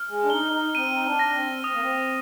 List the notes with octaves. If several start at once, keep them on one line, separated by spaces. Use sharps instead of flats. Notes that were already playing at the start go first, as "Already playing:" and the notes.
Already playing: F6
G#3
D4
D#4 G7
D#4
C4 D#7
D#4
D4
A#6
C4
C4 D#6
A#3
C4